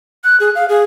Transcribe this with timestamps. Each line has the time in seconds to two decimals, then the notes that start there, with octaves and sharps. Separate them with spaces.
0.24 F#6
0.40 G#4
0.55 F5
0.69 G#4